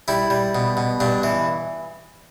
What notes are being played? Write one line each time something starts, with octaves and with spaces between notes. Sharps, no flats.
G3 E4
G3
B2
B2
G2 D4
E3